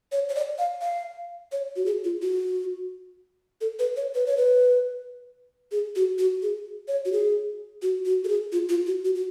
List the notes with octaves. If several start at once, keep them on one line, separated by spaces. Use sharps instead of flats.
C#5
C#5
D5
F5
F5
C#5
F#4
G#4
F4
F#4
A4
B4
C#5
B4
C#5
B4
G#4
F#4
F#4
G#4
C#5
F#4
G#4
F#4
F#4
A4
G#4
F4
F4
F#4
F#4
F#4